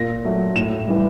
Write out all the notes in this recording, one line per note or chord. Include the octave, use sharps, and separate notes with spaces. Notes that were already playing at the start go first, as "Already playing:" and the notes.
Already playing: A#2 A#6
F#3 A3
A2 E7
E3 G3